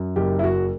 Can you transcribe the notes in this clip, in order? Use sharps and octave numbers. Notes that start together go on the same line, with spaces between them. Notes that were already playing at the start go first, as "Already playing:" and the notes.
Already playing: F#2
F#1 G4
E4
F#1 F#4